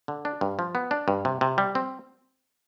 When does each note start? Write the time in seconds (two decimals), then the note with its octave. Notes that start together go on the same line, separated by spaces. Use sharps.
0.08 D3
0.25 D4
0.41 G2
0.59 F3
0.75 B3
0.91 D4
1.08 G2
1.25 C3
1.41 C3
1.58 G3
1.75 C4